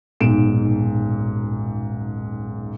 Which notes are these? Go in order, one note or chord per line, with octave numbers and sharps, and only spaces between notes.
D#1 B1 G#2 D7 E7